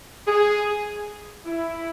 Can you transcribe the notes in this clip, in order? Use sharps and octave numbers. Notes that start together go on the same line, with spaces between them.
G#4
E4